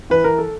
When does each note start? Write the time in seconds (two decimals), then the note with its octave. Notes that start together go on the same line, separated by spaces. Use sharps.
0.10 E3 B4
0.24 A#4
0.38 A4